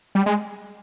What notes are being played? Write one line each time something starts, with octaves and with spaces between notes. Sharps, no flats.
G3
G#3